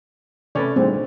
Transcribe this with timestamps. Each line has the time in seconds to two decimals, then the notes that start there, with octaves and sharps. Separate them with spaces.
0.55 C3 A3 C#4 B4 D5
0.76 A#2 D3 D#3 G3 A3 C4 G#4